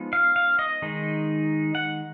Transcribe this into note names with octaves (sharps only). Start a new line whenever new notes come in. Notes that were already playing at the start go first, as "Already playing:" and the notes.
Already playing: F3 G#3 B3 D#4
F5
F5
D#5
D#3 G#3 D#4
F#5